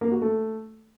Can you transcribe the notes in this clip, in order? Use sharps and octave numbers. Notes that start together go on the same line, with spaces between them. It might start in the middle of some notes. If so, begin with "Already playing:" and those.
A#3
F#4
A3